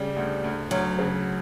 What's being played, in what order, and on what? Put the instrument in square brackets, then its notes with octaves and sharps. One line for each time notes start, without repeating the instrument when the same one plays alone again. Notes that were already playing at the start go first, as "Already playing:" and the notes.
Already playing: [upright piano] C#3 [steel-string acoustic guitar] G3
[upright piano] D2
D2
[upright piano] D2 [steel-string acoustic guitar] F#3
[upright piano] C#3